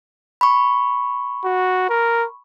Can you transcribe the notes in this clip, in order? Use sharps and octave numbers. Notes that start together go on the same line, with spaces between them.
B5 C#6
F#4
A#4